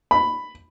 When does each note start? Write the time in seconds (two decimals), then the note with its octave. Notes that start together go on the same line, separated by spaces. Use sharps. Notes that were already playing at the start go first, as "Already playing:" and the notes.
0.11 B5